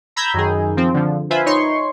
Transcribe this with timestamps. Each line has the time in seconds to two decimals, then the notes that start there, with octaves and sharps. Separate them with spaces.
0.16 A#5 B5 E6 G6 G#6
0.34 F#2 D#3 G#4
0.77 F3 C4
0.94 D3 F3
1.30 F4 B4 C5 E5 G#5 B5
1.46 D#4 C#5 C6 C#6